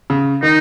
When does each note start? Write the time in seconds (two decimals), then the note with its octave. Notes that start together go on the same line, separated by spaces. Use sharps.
0.10 C#3
0.43 D#3 D#4